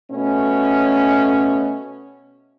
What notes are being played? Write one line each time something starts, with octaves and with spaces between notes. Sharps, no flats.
B2 A3 C#4